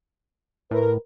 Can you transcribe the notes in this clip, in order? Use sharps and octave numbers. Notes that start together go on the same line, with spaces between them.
A2 A#4 B4